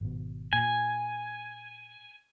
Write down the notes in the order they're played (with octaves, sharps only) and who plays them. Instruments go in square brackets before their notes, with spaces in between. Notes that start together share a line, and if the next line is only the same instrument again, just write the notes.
[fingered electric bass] G#1 B2
[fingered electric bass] A#2 [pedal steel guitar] G#5